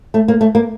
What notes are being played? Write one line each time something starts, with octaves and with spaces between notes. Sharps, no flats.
A3
A#3
A3
A#3